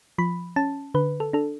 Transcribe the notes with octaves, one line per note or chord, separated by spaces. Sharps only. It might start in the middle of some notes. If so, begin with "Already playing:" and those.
F3 B5
C#4 A5
D3 B4
A4
D4 A4